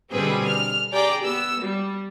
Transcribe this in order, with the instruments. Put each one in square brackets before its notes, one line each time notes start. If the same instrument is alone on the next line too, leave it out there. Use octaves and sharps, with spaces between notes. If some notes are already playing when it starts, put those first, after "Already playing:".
[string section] B2 D3 G3 C4 G#4 B4
F6
G4 G#4 D5 G5 A#5 D6
B3 E6
G3